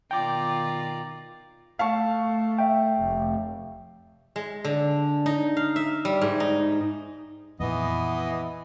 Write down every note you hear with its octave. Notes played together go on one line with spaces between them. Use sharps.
B2 D#3 F4 D5 G5 A#5 D6
A3 F5 A5 C#6
E5 G5
F1
G#3
D3
D#4
F5
E5
G3
G#2
D#4
F2 A#2 E3 B3 D#5